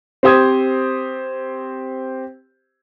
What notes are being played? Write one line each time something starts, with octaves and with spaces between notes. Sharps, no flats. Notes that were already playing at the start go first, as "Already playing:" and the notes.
C4 G4 C5 D#6 G#6